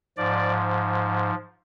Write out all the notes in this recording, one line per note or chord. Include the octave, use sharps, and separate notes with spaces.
G#2 F3 D5